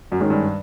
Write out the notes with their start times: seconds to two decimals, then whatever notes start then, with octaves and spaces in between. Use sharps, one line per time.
0.12 F#2
0.20 G#2 D#3 G#3 C#4
0.30 G2